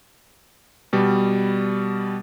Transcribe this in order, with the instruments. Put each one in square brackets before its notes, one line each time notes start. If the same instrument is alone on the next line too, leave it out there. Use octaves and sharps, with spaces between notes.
[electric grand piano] B2 G3